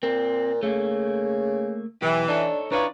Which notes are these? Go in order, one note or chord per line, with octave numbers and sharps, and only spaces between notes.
A#2 C4
C#3 A3 A#3
B1 E3 G4
D4 D#4 A4 C#5
E3 D4 D#4 F4 B4 C#5 D5